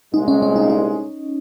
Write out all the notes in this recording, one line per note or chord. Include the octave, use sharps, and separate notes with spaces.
C2 A#2 G#3 D#4
C#4
C#4
D#4
D#4